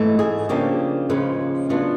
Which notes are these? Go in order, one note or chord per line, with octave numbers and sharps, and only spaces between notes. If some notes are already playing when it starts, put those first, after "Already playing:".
Already playing: G#2 E3 A3
G#4
C#3 F3 A#3 D4 G4
D#2 C#3 F3 G#3 C#4 B4
C#3 F#3 B3 D4 F4